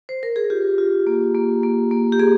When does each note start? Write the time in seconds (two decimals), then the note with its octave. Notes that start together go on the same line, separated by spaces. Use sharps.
0.09 C5
0.23 A#4
0.36 G#4
0.50 F4 G4
0.78 F4
1.07 A#3
1.35 A#3
1.63 A#3
1.91 A#3
2.12 G4
2.19 A#3 G#4